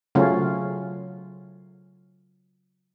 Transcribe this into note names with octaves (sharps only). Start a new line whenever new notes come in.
C#3 F#3 A3 C#4 F4